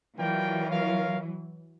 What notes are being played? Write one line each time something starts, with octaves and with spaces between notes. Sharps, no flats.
E3 F#3 F4 A#4 D5 G5
F4 A#4 C#5 F5